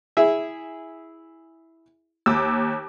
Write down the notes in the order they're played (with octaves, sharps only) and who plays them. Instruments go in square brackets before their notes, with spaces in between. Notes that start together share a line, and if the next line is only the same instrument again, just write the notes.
[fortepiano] E4 G#4 E5
[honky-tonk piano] D#2 D6 [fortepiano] E6